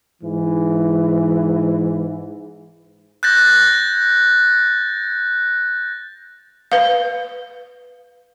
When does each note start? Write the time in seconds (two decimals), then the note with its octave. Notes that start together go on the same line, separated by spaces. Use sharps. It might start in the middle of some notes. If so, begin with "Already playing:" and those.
0.22 G#2 E3
3.23 F#6 G6 A6 A#6
6.72 B4 F5